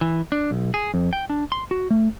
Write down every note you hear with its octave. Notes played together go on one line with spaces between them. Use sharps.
E3
D4
B1
G#4
F2
G5
D4
C6
F#4
A3